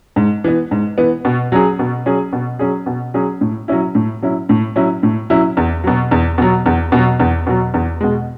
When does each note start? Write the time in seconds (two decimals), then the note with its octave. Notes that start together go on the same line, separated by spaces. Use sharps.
0.16 G#2
0.44 E3 B3
0.71 G#2
0.98 E3 B3
1.25 B2
1.52 F#3 C#4 G#4
1.79 B2
2.06 F#3 C#4 G#4
2.33 B2
2.59 F#3 C#4 G#4
2.86 B2
3.14 F#3 C#4 G#4
3.41 A2
3.68 F#3 C#4 E4
3.95 A2
4.22 F#3 C#4 E4
4.49 A2
4.76 F#3 C#4 E4
5.03 A2
5.30 F#3 C#4 E4
5.57 E2
5.84 B2 F#3
6.11 E2
6.38 B2 F#3
6.66 E2
6.92 B2 F#3
7.20 E2
7.47 B2 F#3
7.74 E2
8.01 B2 G#3